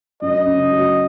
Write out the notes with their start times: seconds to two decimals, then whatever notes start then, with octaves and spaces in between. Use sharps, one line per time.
0.22 F#2 D#5
0.46 C#3
0.71 F#3